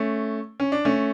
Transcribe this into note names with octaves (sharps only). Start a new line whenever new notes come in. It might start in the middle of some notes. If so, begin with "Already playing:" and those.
Already playing: A3 C#4
C#4
D4
A3 C#4